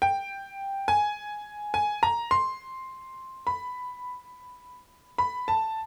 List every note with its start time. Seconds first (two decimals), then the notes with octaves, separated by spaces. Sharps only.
0.02 G5
0.88 G#5
1.74 G#5
2.03 A#5
2.31 C6
3.47 B5
5.18 B5
5.48 A5